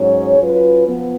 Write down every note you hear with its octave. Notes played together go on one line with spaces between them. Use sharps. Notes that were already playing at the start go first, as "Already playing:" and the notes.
Already playing: G#2 F#3 C#4 G#4 C#5
F#3 C#4 F4 B4
F3 B3